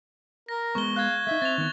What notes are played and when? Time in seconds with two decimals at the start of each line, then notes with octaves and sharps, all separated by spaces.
0.49 A#4 A#6
0.75 G#3 B3 C#6 G7
0.96 F5 F#6 G#6
1.27 A3 D#4 E5
1.42 C4 A6 F7
1.58 D#3 B3